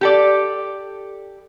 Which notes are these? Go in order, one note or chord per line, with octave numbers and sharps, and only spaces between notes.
G4 A4 D5